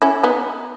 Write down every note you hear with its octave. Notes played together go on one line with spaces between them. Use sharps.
C#4 E4
B3 D#4